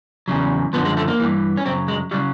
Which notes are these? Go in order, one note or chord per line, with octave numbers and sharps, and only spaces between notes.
E2 C#3 F#3
F#2 D3 F3 B3
G#3
A3
A#3
G2 E3
C#4
F#2 C#3 F#3 C4
G#3
C#3 F#3 G3